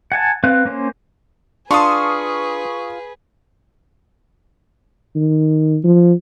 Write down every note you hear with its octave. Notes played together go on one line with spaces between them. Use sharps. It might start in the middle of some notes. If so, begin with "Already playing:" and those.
F#5 G#5 A5
C4 B4 F5 F#6
A#3 C#4 C5
D4 F4 G#4 B4 A5 C6 C#6 D#6
D#3
F3